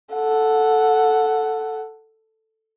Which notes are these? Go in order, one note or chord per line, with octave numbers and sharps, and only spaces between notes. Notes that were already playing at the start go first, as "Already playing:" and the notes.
A4 F#5